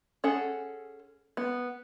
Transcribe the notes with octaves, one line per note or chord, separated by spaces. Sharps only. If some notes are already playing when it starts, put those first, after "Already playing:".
C#4 G#4 A4 F#5
B3